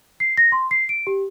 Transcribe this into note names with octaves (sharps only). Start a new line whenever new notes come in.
C7
A#6
C6
C7
D7
G4